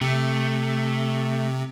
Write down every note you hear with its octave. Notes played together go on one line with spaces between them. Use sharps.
C3 A3